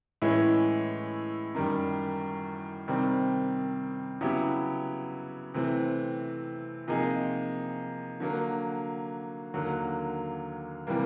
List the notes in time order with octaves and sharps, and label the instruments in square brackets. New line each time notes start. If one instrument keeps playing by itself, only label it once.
[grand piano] A2 E3 G#3 C#4 E4
F#2 D#3 G3
C3 D#3 G3 C4
C#3 F#3 B3 E4 G4
C3 E3 A3 C4
C3 F3 A#3 D#4 G#4
D3 F#3 A#3
D#2 D3 F#3 A#3
C3 E3 G3 A#3